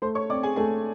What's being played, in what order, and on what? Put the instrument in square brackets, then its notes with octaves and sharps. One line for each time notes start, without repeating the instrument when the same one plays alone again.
[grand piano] A3 [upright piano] C5 C6
[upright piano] C#5 C#6
[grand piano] C4 [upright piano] D5 D6
[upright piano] G#4 G#5
[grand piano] A3 [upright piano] G#4 G#5